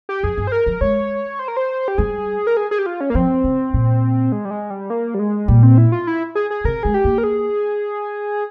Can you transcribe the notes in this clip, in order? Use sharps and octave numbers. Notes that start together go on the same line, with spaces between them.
G4
F2 G#4
G2
C5
A#4
F3
G#3 C#5
C5
A#4
C5
G4
G3 G#4
A#4
G#4
G#4
G4
F4
C#4
A#3
F3 C4
C#3
A#2
G#3
G3
G#3
G3
A#3
G3
G#3
A#2 G3
C4
E4
F4
E4
G#4
G#4
C3 A#4
G#3 G#4
G4
A#3
A#4
G#4